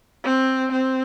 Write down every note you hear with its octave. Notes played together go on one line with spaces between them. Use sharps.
C4
C4